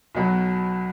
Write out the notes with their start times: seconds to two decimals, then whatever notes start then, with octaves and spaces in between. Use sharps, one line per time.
0.15 B1 B2 F#3